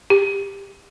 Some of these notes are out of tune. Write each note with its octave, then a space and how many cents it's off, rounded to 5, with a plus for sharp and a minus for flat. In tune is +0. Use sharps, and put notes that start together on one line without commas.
G4 +20